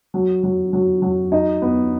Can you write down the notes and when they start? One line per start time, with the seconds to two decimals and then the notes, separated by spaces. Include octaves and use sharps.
0.14 F#3
0.43 F#3
0.73 F#3
1.02 F#3
1.32 D#4
1.62 B3